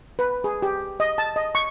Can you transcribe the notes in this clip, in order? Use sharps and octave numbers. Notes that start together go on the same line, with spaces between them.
B4
G#4
G4
D#5
A5
D#5
C#6